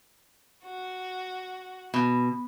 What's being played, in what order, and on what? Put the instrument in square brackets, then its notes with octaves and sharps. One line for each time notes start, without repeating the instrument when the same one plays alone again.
[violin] F#4
[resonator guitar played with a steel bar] B2